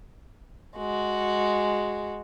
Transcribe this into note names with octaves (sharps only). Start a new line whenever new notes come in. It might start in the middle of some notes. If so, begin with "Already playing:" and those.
G#3 F#4